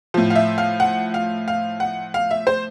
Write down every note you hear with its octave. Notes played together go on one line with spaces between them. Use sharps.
A2 F3
F5
E5
F5
F#5
F5
F5
F#5
F5
E5
C5